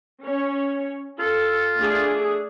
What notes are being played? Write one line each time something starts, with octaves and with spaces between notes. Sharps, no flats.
C#4 C#5
F4 A4
A3 D4 G#4